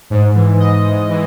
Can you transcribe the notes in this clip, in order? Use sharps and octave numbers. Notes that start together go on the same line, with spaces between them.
G#2
E3
E3 D#5
G#2
E3